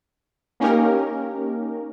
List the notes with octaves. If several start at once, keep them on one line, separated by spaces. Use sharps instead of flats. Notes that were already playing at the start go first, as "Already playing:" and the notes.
A#3 C#4 D#4 G4 A#4